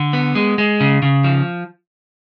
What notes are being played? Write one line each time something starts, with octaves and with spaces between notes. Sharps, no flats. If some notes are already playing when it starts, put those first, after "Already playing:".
Already playing: D3
B3
G#3
G#3
C#3
C#3
F3